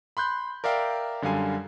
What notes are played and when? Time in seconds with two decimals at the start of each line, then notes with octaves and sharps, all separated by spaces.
0.17 B5 C6 F#6 G6
0.64 A#4 D5 E5 F5 G5
1.22 F#2 D3 G3 F5 G#5